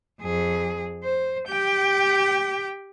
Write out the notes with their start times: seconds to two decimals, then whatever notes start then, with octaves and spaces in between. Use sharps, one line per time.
0.21 F2 G#4
1.03 C5
1.48 G4 G5